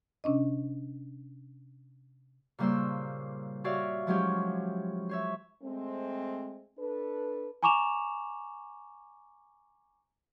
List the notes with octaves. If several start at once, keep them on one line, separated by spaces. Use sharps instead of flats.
C3 C#4 D4 D#5
A#2 C#3 G3 A#3 C5 E6
F#4 G4 C#5 D5 E5 F5
F3 F#3 G#3 C#4 E4 G4
C5 C#5 E5
G#3 A3 C4
D4 A4 B4
G#5 A#5 C#6 D6 E7 F7